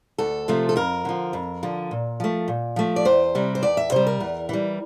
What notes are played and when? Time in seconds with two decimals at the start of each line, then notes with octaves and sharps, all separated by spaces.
0.18 D2 A4
0.48 C3 F3 A3
0.69 A4
0.76 F2 A#4
1.05 D3 F3
1.33 F2
1.63 D3 F3
1.91 A#2
2.20 F3 A3
2.48 A#2
2.76 F3 A3
2.96 D5
3.05 E2 C5
3.35 C3 G3
3.55 C5
3.63 E2 D5
3.77 E5
3.92 C3 G3 C5
4.07 A#4
4.20 E2
4.49 E3 G3